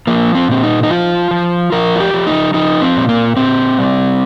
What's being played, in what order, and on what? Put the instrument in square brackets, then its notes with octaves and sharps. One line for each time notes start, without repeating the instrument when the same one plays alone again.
[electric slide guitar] F3 A#3
C4
A#2 C4
D#4
D#4
F3 F4
F3
F3 A#4
F4
G4
F3
D#4
F3 D#4
C4
A#2
A#3
A#2 C4
G3